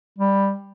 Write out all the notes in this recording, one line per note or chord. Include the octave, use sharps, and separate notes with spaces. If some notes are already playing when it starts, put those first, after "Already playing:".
G3